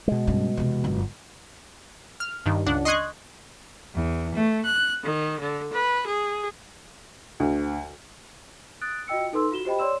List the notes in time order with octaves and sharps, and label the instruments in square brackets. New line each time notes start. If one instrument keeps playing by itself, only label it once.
[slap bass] B2 G#3
[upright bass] G2 C#3
E2 C3
G1 F#2
[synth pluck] F6
G2 D#3
C#2 D4 F#5
D#5 C6 C#6 D#6 F#6 G#6
[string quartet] E2
A3
F#6
D#3
D3
B4
G#4
[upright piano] D2
[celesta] D#6 F#6 A6 D7
F4 F#4 D#5 G5 E6 C#7
D#4 A4 B4 C6 E6
F4 F#4 E7 G7
G4 C5 D#5 G5 B5
C#5 D5 C6 E6 E7